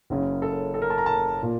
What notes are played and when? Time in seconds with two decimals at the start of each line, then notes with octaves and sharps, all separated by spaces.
0.10 F#1 F#2 C#3
0.42 A4
0.74 A4
0.82 A#4
0.90 A5
0.98 A#5
1.06 A5
1.42 A#2